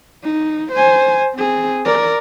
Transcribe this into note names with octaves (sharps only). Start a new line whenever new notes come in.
D#4
C5 G#5
C4 G#4
A#4 D5